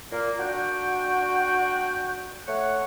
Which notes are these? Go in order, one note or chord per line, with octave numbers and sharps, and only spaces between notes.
A#2 A#3
D4 F#4 G5
A3 C#5 F#5